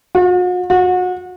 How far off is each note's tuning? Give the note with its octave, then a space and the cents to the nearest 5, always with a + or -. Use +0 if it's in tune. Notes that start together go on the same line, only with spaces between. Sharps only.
F#4 -45
F#4 -30